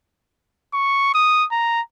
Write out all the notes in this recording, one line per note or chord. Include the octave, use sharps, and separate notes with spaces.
C#6
D#6
A#5